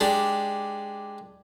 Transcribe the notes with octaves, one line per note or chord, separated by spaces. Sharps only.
G#3 D4 G4